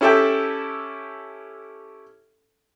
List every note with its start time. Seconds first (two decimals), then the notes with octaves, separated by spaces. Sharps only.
0.01 C#4 E4 G4 A4 E5 G5